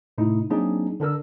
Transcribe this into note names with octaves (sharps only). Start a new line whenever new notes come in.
A2 C3 A3 D#4 E4
F#3 A#3 C4 D4 D#4 G#4
D3 D4 A#4 E6